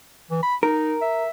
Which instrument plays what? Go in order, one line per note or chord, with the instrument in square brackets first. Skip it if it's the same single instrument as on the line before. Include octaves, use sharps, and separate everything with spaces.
[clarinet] E3
B5
[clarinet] D#4 [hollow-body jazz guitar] A#4
[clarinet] E5